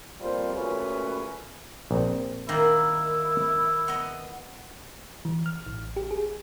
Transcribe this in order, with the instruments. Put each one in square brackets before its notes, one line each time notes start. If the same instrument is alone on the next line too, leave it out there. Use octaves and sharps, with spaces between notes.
[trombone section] F2 G3 A#3 F4 C5
A#2 C#3 A3 C#4 F#4 B4
[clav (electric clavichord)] A#1 C4
[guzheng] D#3 A#3 [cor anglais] E4
[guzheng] B3 D#5
[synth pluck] E3
F6
A1
G4
G#4